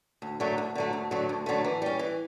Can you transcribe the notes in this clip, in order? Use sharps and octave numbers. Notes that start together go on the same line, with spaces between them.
D2
D3 F#3 A3
D2
D3 F#3 A3
D2
D3 F#3 A3
D2
D3 F#3 A3
E3
G3 C#4
E3